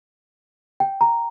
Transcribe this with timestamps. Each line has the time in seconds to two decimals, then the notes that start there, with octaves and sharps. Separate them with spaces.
0.80 G5
1.01 A#5